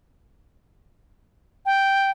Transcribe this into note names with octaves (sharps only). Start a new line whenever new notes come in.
G5